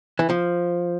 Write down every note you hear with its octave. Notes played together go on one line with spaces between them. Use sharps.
E3
F3